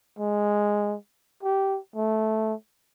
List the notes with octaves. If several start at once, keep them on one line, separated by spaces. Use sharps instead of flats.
G#3
G4
A3